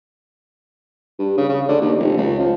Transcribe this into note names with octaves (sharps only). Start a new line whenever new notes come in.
G2
C#3
C#3
D3
D#2
F1
C#2
F3